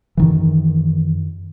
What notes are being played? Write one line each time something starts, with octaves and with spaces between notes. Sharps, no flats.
F#2 D#3 E3